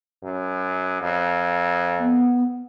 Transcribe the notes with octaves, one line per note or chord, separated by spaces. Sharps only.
F#2
F2
B3